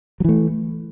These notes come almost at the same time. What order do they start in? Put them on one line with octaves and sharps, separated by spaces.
F#3 E3 A3